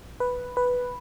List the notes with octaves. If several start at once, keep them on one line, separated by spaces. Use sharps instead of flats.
B4
B4